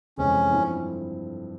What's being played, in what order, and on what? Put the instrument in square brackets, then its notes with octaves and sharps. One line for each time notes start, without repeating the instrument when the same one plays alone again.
[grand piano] F1 F2 E3 G#3 C4 [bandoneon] C#4
[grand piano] G2 F3 C4 E4